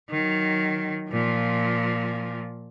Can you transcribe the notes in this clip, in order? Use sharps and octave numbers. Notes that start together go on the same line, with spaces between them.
D#3 F#3
A#2 F3